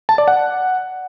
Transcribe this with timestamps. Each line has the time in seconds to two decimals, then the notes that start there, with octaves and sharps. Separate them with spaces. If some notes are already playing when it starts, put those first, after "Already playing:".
0.09 A5
0.18 D5
0.28 F#5